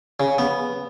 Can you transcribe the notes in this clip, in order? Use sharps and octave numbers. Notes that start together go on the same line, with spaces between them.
C#3
B3